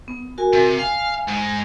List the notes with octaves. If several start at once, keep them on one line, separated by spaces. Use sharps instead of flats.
B3
F#4 A#4 G#5
C3
F5 G#5
G#2 G#3